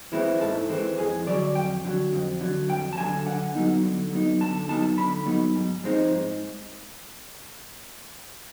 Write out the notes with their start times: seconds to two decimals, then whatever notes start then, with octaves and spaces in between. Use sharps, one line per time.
0.12 E3 G#3 C4 E4
0.41 G#2 A4
0.69 E3 G#3 C4
0.98 F2 G#4
1.26 D3 F#3 D5
1.55 F2 G5
1.84 D3 F#3
2.12 F2
2.41 D3 F#3
2.69 F2 G5
2.93 A5
2.98 D3 F#3 G#5
3.26 D3 F#5
3.55 F#3 B3 D#4
3.83 D3
4.12 F#3 B3 D#4
4.40 D3 A5
4.69 F#3 B3 D#4 A5
4.97 D3 B5
5.26 F#3 B3 D#4
5.55 G#2
5.84 F3 G#3 C4 D#4
6.11 G#2